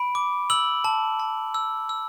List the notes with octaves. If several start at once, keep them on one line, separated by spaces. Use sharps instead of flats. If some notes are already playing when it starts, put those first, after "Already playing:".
Already playing: B5 D7
D6
E6 F#7
A5
A5
E6
E6